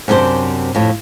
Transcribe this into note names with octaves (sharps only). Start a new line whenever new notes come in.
F#2 C3 D4 G#4 C5
F2 A2